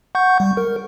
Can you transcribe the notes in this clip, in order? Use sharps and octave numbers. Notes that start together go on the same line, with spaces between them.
F#5 C#6 G6
G3
A#4